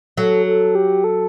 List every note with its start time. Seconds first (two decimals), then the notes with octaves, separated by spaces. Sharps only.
0.17 F#3 A4
0.46 A4
0.75 G4
1.04 A4